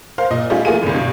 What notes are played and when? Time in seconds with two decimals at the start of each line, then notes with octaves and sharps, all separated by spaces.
0.18 A#4 C5 F5
0.30 A#2 D#5
0.50 G3 A3 C#4 D#4 F4 G#4
0.65 E3 A3 A#3 F4 G#4 D#7
0.82 G#1 C#2
0.94 G2 B2